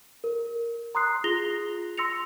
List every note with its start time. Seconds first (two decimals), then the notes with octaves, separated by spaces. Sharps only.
0.24 A#4
0.95 A#5 C6 D#6 F#6 C7
1.24 F4 G#4 A#6 F7 G7
1.97 C6 E6 A#6 C#7 F7